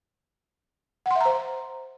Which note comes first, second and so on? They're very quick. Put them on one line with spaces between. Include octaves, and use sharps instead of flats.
F#5 C6 E5 A#5 C5